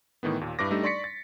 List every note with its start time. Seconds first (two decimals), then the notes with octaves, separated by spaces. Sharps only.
0.23 A2 D#3 E3 B3
0.41 D#2 A#2
0.59 G2 E4 B4 D6 A#6
0.71 G3 A3 D4 D#4 G4 A4
0.83 D5 C6 C#6 A6 B6 C#7
1.04 A6